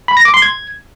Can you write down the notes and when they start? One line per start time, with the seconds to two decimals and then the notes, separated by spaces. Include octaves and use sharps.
0.08 B5
0.17 A#6
0.25 D6
0.34 C6
0.42 G#6